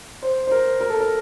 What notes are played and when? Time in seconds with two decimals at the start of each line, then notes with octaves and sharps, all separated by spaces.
0.23 C5
0.47 C5
0.51 A#4
0.81 A#4
0.90 A4
1.01 A#4